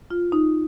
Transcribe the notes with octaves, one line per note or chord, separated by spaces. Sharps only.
F4
D#4